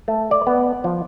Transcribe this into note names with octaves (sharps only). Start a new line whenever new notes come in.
A3
D5
B3
F3